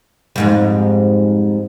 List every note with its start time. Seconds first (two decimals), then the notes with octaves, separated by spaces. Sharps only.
0.36 F2 G#2 G3